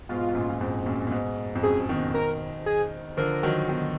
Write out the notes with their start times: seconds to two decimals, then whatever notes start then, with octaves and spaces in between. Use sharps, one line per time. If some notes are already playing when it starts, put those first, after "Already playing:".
0.09 G#2 B2 F4
0.29 G#2
0.35 F#2 A#2
0.50 A#2
0.61 F2 G#2
0.86 F#2 A#2
1.07 A#2
1.12 G#2 B2
1.55 F2
1.63 F#2 G#4
1.89 B2 D#3
2.14 A#4
2.66 G#4
3.17 D3 F3 A#4
3.43 D#3 F#3
3.69 B2 D#3